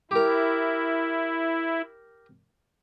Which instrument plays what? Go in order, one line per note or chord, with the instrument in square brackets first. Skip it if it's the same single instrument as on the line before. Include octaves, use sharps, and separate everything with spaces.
[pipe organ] E4 [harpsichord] G4 A#4